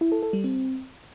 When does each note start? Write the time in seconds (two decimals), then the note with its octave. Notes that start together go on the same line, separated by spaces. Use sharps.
0.01 E4
0.12 A4
0.23 A4
0.33 G3
0.44 C4